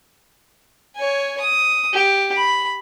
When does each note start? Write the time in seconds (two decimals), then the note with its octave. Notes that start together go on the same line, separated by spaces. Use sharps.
0.95 C#5 G#5
1.40 D#6
1.93 G4
2.36 B5